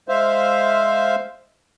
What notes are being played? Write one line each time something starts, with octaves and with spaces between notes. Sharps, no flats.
G#3 C5 E5 F5